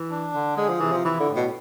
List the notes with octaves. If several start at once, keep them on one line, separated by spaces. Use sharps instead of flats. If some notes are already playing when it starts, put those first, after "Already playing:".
Already playing: E3
D4
D3
G#3 G#4
F3
C3 E3
F3
E3 E4
D3
A2
B2